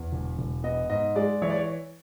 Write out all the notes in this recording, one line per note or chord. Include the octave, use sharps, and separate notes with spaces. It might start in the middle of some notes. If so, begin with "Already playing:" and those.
Already playing: E2
E1
E1
B3 D#5
G#2 D#5
G#3 D5
E3 C#5
D5
C#5